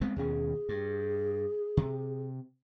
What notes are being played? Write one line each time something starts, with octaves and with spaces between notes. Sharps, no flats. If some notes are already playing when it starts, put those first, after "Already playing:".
G#3 B3 C4
D#2 B2 C#4 G#4
G2
C3